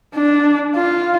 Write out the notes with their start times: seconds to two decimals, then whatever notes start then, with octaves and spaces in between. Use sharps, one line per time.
0.16 D4
0.75 F4